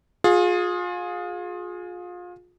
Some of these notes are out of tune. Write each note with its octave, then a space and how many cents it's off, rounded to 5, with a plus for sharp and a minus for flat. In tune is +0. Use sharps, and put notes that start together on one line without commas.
F4 +30 G#4 +0